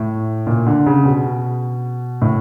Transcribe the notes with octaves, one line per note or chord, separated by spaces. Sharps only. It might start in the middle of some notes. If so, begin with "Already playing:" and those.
Already playing: A2
A#2
D3
C#3
B2
A2